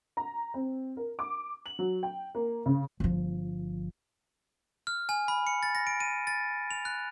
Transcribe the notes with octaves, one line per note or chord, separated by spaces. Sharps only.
A#5
C4
A#4
D6
F#7
F#3
G5
A#3
C#3
G1 F3
F6
G#5
B5
C#7
A6
A#6
D7
D#7
A6
F7
F#6